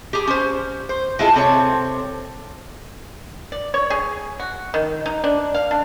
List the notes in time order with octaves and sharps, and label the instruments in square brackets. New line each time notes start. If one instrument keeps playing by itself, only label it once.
[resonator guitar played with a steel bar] G4 G#4
C#4 C5
C5
G#3 E4 F4 G#4 A4
C3 C4 A4 C#5
[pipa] D5
C#5
G#4
F#4
D#3
D#4
D4
F5
D4